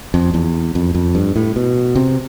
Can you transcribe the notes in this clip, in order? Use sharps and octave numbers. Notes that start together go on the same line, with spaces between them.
F2
E2
F2
F2
G2
A2
B2
C3